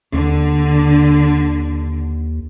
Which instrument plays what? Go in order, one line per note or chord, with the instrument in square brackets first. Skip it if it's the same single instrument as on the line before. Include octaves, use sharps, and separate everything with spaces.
[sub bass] D#2 [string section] D3